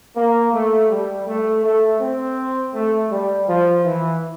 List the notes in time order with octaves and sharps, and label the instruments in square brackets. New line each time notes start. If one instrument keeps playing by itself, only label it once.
[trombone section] A#3
A3
G3
A3
A3
C4
A3
G3
F3
E3